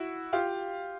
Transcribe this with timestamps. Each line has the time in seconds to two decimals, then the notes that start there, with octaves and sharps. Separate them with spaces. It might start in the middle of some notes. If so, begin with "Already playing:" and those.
Already playing: E4 F#4
0.33 F4 G4